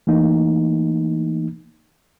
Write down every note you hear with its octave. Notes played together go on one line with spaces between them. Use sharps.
E3 A3 A#3 D#4